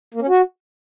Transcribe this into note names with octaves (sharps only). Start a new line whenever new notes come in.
A#3
C#4
F#4